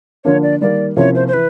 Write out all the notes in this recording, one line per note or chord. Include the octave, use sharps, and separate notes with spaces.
D3 F3 A#3 D4 C#5
D5
D#3 G3 A#3 D5
C3 F3 A#3 C#4 E4 C#5
C5
C5
E3 B4